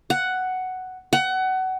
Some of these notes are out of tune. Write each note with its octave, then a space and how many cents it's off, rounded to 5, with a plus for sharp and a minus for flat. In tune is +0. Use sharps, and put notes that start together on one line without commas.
F#5 +5
F#5 +25